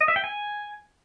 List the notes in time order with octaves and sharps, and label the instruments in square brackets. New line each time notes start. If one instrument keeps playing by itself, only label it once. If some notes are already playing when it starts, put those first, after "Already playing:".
[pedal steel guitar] D#5
E5
G5
G#5